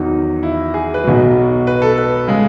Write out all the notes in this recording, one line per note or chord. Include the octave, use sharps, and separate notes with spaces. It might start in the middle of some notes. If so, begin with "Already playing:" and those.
Already playing: E2 D#3 F#3 D#4
E4
G#4
B4
B1 B2 F#3
B4
A4
B4
C#3 G#3